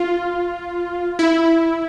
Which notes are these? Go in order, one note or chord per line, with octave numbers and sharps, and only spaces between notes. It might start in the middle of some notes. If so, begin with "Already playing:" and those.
Already playing: F4
E4